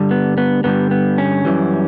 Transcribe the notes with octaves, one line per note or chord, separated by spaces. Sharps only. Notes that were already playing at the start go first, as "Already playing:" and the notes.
Already playing: G2 D3 G3
B3
B3
G2 D3 G3 B3
B3
C#4
F#2 E3 G3